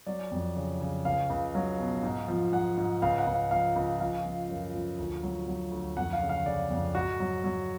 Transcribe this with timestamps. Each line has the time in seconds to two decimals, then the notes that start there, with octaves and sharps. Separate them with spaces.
0.07 F#3 D5
0.31 F2
0.56 C#3
0.80 C#3
1.05 C#2 F5
1.30 C#2
1.55 F#3
1.79 B2
2.03 G#2
2.28 F3
2.52 G#2 F#5
2.77 G#2
3.02 C#2 F5
3.18 F#5
3.27 C#2
3.34 F5
3.51 F3 F5
3.76 C#2
4.00 F3 F5
4.25 F3
4.49 F#2
4.74 F3
4.98 D2
5.23 F#3
5.47 F#3
5.72 D2
5.97 F2 F#5
6.13 F5
6.21 C#3
6.29 F5
6.46 C#3 D5
6.70 F2
6.95 G#2 F#4
7.20 F#3
7.44 F#3